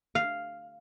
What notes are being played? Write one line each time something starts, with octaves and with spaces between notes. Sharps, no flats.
F5